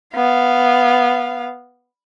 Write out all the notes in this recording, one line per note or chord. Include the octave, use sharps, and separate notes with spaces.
B3 F5